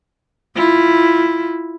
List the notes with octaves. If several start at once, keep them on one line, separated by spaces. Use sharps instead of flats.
E4 F4